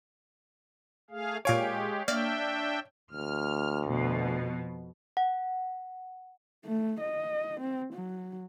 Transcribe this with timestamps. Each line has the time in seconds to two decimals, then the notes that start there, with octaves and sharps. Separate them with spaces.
1.10 A3 G#4 F5
1.45 A#2 G#3 G4 C#5 F5 G#5 D7
2.08 A#3 D4 D5 E5 G5 F6
3.12 D2 F6
3.83 F2 B2
5.17 F#5
6.66 A3
7.01 D#5
7.60 C4
7.93 F#3